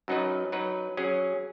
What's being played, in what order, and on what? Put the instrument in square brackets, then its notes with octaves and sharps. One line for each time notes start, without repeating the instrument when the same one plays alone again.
[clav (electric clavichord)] F#2 F#3 D#4 B4 D#5
F#3 D#4 B4
F#3 C#4 G#4